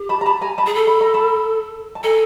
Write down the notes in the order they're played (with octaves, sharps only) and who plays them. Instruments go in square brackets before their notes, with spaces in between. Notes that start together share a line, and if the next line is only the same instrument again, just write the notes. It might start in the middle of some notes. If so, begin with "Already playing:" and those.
Already playing: [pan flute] G4
[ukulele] A5 B5
A#5
A5 B5
G#5 A#5
A5 B5
[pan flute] G#4
A4
[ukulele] B5
A#5
A5 B5
A5
[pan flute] A4 [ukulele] G#5 A#5